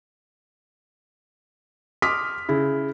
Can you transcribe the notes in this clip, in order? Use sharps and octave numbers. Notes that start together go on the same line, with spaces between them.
C6 D6 D#6 F6 B6
C#3 E4